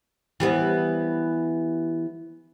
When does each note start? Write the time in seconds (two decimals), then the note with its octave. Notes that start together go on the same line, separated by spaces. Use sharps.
0.40 E3 G3 B3